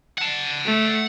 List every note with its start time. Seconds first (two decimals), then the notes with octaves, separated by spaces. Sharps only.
0.18 F#5 A5
0.65 A3